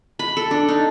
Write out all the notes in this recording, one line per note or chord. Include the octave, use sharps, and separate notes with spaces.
B5
A4
D4
D#4